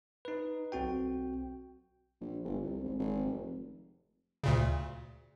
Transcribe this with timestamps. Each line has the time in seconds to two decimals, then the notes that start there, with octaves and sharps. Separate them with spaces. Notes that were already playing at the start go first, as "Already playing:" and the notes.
0.25 D#4 B4
0.72 B1 C4 F#4 G5
2.21 A#1
2.44 G1
2.63 C2
2.84 G#1
2.99 G#1
3.25 F1
4.44 D2 A#2 C#3